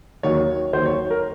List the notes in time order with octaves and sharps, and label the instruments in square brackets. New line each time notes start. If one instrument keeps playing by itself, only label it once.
[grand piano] D#2 D#3 F#3 C#5
D#2 D#3 F#3 C5
C#5
A#4